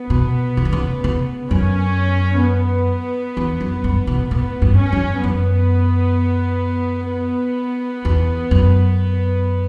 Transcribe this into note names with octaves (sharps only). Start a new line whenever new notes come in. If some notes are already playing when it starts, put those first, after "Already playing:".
Already playing: B3
B2
C#3
D3
C#3
C#3
F#2 C#4
B3
E2
F#2
G2
B2
A2 B3
G2
C#4
F#2
F#2 B3
B3
E2
F#2